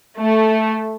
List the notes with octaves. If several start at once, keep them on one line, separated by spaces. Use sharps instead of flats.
A3